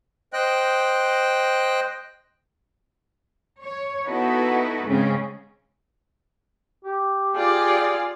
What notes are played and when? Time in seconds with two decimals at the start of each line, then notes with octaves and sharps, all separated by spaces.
0.33 C5 D#5 G5 F#6
3.62 C#5
4.07 B3 D#4 E4 F#4 A4 B4
4.85 G#2 C#3 G#3 C4 C#4
6.85 G4
7.36 F4 G#4 D5